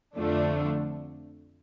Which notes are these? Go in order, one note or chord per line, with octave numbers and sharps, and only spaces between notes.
F2 D3 F3 A3 D4